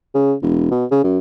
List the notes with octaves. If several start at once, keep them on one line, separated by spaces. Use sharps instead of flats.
C#3
E1
B2
C#3
F#2